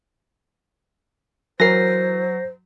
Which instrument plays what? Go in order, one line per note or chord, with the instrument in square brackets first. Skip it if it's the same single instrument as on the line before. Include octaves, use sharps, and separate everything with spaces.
[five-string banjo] E3 A#4 [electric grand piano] F#3 [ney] C5 [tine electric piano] A#6 C7